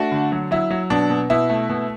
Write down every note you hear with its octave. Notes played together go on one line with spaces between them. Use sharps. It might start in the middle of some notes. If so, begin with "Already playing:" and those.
Already playing: A3 D4 F#4
D3
F#3
F#3 E4
F#3
B2 D4
B2
B2 E4
A3
B2